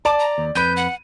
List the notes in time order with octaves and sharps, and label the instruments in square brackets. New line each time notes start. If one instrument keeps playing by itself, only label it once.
[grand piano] D5 [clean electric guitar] A5 [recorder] D6
[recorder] A#5
[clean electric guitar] D#2
[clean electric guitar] F2 B4 [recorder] G6 [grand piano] D#7
[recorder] F#5